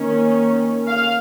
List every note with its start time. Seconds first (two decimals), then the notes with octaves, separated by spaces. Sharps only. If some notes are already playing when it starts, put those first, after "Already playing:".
Already playing: D#3 A#3 C#4
0.88 F5